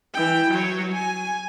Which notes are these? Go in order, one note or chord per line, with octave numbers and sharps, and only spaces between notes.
E3 G5
F#3 C#5
G#5